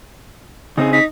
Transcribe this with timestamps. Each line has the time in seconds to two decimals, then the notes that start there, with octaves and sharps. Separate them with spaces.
0.78 C#3 C4 D#4 G#4
0.93 D#4 B6